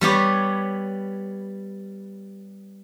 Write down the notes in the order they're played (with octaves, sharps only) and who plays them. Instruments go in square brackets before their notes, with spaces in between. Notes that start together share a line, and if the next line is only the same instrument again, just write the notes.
[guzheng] G3 B3 G4 C#5